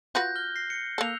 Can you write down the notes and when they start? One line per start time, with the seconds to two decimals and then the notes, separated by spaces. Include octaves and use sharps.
0.15 F4 F#4 B4 F#6 G6 A#6
0.35 F6 G7
0.55 A#6 C7
0.70 C#7
0.98 A#3 A4 E6 F#6 F7